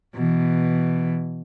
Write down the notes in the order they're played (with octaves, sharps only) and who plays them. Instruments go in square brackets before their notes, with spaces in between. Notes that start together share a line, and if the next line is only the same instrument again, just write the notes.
[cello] B2 E3